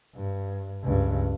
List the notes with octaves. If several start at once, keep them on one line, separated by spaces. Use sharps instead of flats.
G2
C#2 G2